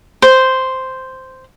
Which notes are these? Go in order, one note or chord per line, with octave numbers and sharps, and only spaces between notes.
C5